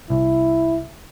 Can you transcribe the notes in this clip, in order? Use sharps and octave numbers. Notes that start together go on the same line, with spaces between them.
C2 E4